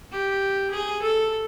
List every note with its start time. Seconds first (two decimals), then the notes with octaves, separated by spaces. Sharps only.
0.12 G4
0.71 G#4
1.02 A4